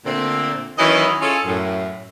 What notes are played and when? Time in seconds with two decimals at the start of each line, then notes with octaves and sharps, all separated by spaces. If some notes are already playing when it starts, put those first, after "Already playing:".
0.05 A#2 D3 A3 C4
0.78 D#3 E3 F#3 C#4 E4 D#5
1.21 C#4 F4 G#4 A4
1.45 F#2 A2